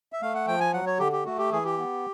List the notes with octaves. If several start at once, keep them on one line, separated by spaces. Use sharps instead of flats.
E5
A3 F5
F#5
F3 G5
G#5
F#3 F#5
C#5
D3 G4
G4
A3 F#4
G4
E3 G#4
G4
B3